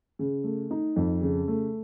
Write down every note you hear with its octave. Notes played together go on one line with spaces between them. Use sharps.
C#3
A3
D#4
F2
C#3
A3